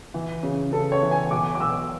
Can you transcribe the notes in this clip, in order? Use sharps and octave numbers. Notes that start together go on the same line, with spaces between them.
E3
C#3
C#3 A4
C#5
E3
G#5
B1 D6
D6
B1 E6